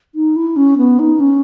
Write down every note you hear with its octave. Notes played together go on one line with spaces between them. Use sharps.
D#4
E4
C#4
B3
D#4
C#4